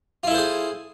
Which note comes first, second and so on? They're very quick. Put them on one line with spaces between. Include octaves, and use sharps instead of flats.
F4 E4 A4 C5 G#4